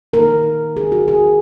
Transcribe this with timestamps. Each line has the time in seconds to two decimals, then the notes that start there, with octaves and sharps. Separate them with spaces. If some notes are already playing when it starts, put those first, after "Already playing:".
0.13 D#3 A#3 D#4 A#4
0.77 G#4
0.92 F#4
1.08 G#4